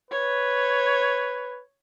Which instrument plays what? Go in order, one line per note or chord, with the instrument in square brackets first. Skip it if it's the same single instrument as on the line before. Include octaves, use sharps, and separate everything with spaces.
[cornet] B4 [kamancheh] C#5